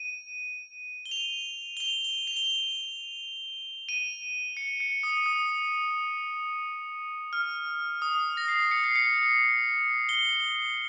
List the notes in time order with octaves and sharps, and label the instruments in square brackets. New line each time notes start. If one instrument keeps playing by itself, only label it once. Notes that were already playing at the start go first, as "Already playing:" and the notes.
Already playing: [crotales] D#7
G7
F7
G7
F7
G7
F7
G7
F7
D#7
C#7
C#7
D#6
D#6
F6
D#6
A#6
C7
C#7
C7
C#7
G7